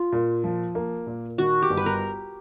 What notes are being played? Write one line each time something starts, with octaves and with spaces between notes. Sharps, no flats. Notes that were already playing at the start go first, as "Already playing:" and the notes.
Already playing: F4
A#2
F3
A#3
A#2
D#3 F#4
G4
G1
B4
A#4